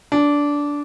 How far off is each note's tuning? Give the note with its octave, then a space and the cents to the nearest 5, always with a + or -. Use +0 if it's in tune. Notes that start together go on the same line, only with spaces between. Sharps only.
D4 -15